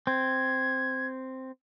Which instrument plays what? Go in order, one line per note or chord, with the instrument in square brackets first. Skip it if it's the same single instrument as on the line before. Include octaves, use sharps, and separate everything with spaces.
[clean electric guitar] C4 [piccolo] G#6